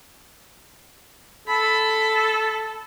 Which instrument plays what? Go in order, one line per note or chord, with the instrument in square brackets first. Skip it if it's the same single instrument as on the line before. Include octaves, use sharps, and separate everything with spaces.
[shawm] A4 [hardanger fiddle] B5